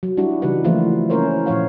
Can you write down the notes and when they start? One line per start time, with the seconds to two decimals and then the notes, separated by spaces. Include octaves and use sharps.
0.03 F#3
0.17 G3 D4 E4 F#4
0.42 C#3 E3 G3 D#4 B4 F#5
0.64 E3 F3 A3 A#3 E4 F4
1.10 A#3 C#4 E4 A#4 C5 C#5
1.46 A#2 F3 C#4 C#5 F5 F#5